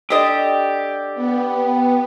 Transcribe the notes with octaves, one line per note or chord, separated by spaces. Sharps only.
D3 G4 A4 D5 D#5
B3